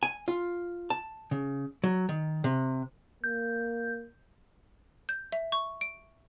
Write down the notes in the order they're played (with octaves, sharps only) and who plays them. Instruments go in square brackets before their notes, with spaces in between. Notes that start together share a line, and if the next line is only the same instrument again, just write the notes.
[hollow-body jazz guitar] G#5
F4
A5
C#3
F#3
D#3
C3
[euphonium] A#3 [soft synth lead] G6
[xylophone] G6
E5
C#6
D7